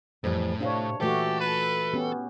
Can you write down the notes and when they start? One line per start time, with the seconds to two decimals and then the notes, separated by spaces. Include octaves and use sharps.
0.24 F2 A2 E3 G3
0.60 C3 D4 C#5 F5
1.01 A#2 E3 A3 F#4 G4 A4
1.40 B4
1.93 B3 C#4 G4